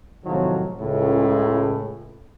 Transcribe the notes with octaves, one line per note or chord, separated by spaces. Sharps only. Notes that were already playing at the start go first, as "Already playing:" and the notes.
G#1 A2 C3 D#3 F3 F#3
C#2 A2